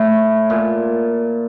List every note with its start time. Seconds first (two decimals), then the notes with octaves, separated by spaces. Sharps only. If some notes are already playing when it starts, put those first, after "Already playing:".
Already playing: A2
0.50 A#2